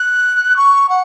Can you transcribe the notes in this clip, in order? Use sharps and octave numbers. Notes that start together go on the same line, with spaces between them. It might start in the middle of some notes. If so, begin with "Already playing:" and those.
Already playing: F#6
C#6
F#5